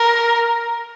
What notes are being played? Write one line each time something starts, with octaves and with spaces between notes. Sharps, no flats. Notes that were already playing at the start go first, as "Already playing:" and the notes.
Already playing: A#4